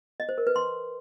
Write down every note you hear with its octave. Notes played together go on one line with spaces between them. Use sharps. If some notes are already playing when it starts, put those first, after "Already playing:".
D#5
C5
A#4
B4
C6